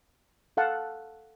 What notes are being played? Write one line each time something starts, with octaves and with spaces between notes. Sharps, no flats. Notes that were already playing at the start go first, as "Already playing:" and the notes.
A4 F5 F#5 A5